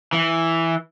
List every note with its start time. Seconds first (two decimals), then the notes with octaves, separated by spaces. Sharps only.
0.13 E3